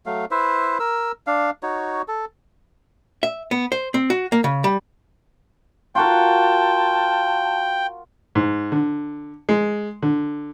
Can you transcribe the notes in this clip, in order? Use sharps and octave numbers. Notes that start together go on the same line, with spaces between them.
F#3 A3 F5
E4 B4 C5 E5
A#4 E6
D4 F5
D#4 F#4 C#5
A4
E5
B3
C5
C4
F#4
A#3
C#3
G3
F4 F#4 A#4 G5 A5
G#2
D3
G#3
D3